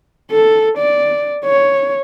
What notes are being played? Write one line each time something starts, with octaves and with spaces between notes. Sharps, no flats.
A4
D5
C#5